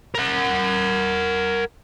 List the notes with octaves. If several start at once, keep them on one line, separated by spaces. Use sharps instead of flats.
A#4 F#5